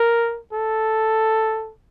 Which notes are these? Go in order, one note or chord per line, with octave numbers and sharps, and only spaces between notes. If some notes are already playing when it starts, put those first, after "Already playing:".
Already playing: A#4
A4